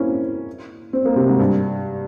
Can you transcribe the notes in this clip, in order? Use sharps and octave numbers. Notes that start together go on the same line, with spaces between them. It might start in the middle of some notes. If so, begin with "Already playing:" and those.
Already playing: A#3 C4 C#4 E4
C4
A#3
C3
G#2
G2